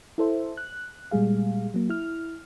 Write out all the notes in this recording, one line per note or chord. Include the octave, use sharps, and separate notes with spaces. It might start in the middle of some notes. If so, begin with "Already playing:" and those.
E4 A4 C5 E5
F#6
A#2 G3 G#3 G#4 F5
F#3 A#3
E4 F6